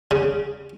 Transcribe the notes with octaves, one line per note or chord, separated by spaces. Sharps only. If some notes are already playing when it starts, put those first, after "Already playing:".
C#3